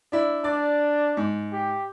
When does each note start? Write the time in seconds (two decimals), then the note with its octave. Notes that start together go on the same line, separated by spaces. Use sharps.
0.12 D4 E4
0.44 D4 D5
1.17 G#2
1.53 G4